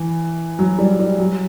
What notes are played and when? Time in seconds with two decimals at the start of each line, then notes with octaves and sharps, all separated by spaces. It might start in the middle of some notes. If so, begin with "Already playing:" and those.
Already playing: E3
0.59 F#3
0.79 G3
0.99 G3
1.19 F#3